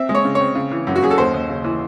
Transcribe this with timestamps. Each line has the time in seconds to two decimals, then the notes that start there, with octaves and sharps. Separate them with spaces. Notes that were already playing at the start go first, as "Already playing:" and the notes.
Already playing: C4 E5
0.09 G#3
0.15 C#5
0.25 C#3
0.35 C#5
0.40 C4
0.55 C#3
0.71 E3
0.87 F#2
0.96 F#4
1.03 F#2 G#4
1.11 A4
1.18 D#2 C5
1.34 D#2
1.49 C#3
1.64 E3